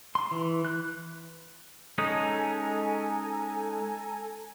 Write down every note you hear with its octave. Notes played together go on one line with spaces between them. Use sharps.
C6
E3
F#6
G#3 C#4 D#4 A4 G#5 A#5